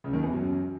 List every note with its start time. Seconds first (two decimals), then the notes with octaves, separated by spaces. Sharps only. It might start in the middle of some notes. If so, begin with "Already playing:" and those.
0.04 C#2 C#3
0.13 D#2 D#3
0.23 E2 E3
0.33 F#2 F#3